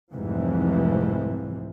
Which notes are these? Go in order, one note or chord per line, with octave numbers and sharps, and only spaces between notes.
F1 C2 G#2 C3 E3 F3